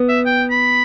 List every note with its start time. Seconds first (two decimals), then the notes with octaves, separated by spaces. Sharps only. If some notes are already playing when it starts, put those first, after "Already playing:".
Already playing: B3
0.09 E5
0.26 G5
0.51 B5